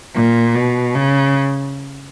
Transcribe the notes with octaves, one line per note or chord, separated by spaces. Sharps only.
A#2
B2
C#3